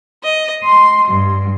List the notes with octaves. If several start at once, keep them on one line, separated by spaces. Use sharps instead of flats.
D#5
C6
G2